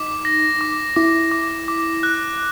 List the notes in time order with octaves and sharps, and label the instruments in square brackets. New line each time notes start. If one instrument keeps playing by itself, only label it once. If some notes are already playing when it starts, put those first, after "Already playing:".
Already playing: [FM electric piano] D#4 [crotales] D6
[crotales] A#6
D6
[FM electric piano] E4 [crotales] D6
[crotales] D6
D6
F#6